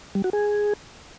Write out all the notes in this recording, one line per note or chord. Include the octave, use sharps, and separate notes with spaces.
G3
F#4
G#4